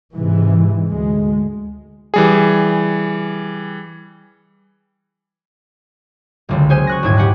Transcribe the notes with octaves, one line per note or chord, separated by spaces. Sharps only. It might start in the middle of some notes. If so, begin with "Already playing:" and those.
G#2 C3 E3
D2 G#3
E3 G3 G#4
F#1 C#2 D3
C#4 G#4 C5 G#5
C#6 F#6 A#6
D#1 D#2 G#2 E4 G#6
G4 F#5 G#5 B5 D6 F#6